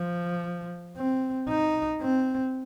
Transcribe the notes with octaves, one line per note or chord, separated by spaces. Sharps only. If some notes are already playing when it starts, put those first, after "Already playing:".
Already playing: F3
C4
D#4
C4